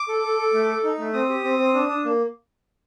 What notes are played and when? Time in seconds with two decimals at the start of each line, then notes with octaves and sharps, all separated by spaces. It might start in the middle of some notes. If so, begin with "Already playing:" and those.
Already playing: D6
0.08 A4
0.23 A4
0.38 A4
0.54 A3
0.69 A4
0.84 D#4
0.99 A3
1.13 C4 D#6
1.29 G4
1.44 C4
1.59 C4
1.74 D4
1.89 D4
2.05 A#3